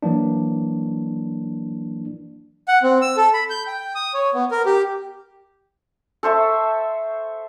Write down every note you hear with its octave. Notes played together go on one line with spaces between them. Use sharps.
E3 F#3 A#3 D4
F#5
C4
E6
A4
B5
G6
G5
D#6
C#5
B3
A#4
G4
A4 C5 E5 C#6